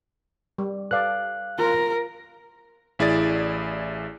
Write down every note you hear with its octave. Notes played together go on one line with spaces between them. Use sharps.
G3
A4 B4 D5 F5 F#6
F4 A#4
A1 E4 G#4 D5 A6